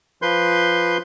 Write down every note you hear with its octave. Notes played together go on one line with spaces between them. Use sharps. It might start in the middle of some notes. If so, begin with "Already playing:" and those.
F3 B4 C6 G6